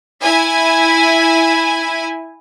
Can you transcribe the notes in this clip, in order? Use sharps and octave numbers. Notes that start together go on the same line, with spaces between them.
E4 G#5